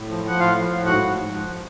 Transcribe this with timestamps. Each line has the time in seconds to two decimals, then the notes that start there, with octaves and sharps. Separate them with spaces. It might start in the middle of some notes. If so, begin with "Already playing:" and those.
Already playing: A2
0.09 F3
0.24 F3 F#5
0.40 A2 F4 F5
0.55 F3
0.71 A2
0.85 G#2 F#4 F#5
1.01 G#2
1.17 G#2
1.32 F3